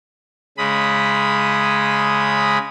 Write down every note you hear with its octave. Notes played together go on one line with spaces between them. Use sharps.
C#3 G#3 B5 D#6